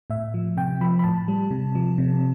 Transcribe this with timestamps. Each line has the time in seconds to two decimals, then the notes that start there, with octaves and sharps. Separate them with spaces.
0.10 A2 E5
0.34 F3
0.57 C3 G5
0.81 F3 B5
0.99 B5
1.04 A2 A5
1.28 G3
1.51 C3
1.75 F3
1.98 C3